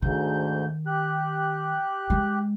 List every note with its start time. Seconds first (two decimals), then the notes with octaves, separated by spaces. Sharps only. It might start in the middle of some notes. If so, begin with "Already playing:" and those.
0.02 D2 G#2 D#3 G6
0.87 G4 F#6
2.10 G#3